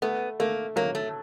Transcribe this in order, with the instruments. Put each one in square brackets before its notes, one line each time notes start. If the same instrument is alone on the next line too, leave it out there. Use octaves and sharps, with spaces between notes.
[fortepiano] A3 [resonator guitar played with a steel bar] B3
[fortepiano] A3 [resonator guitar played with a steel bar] A#3
[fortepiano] F#3 [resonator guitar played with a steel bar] A#3
[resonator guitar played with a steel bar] A3